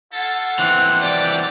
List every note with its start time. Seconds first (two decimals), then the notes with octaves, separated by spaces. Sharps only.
0.13 E4 F4 A4 F#5
0.59 E3 C4 F#6
1.02 G4 D5 D6